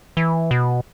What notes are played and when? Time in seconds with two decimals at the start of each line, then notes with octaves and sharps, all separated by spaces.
0.17 E3
0.51 B2